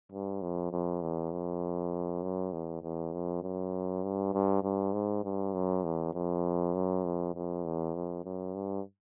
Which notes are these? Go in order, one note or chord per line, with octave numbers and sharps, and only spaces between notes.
G2
F2
F2
E2
F2
F#2
E2
E2
F2
F#2
G2
G2
G2
G#2
G2
F#2
E2
F2
F#2
F2
F2
E2
F2
F#2
G2